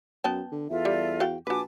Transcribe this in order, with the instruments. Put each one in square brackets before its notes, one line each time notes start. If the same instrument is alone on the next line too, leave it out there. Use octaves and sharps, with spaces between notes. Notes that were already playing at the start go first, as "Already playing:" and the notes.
[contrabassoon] F#2 [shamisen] B3 G5 A5
[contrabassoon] D3
[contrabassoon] E2 [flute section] F4 A4 E5
[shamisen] G3
F#4 F5 G5
[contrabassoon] A#1 [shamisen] F#4 B4 [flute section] G#5 A5 D6